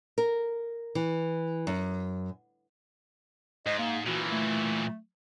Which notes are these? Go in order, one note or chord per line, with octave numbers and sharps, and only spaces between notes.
A#4
E3
F#2
G#2 D#5
A#3
A#2 E3 F#4
A3